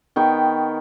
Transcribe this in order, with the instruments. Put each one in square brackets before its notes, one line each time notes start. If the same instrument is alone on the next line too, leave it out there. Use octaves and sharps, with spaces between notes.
[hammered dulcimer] D#3 B3 G5 C#6